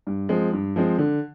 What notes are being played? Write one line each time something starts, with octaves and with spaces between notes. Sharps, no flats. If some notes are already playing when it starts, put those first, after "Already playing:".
G2
F3 G#3 C4
G2
F3 G#3 C4
D3